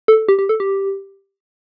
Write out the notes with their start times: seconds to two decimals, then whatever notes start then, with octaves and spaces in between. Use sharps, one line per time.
0.08 A4
0.28 G4
0.39 G4
0.49 A4
0.60 G4